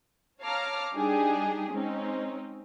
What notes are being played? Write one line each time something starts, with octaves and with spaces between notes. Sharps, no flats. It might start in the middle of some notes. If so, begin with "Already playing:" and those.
C#5 F5 A5 A#5 D6 F6
G3 D4 D#4 G4 G#4
G#3 C4 C#4 D#4